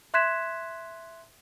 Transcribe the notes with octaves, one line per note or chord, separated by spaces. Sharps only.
E5 C6 F#6 G#6 B6 E7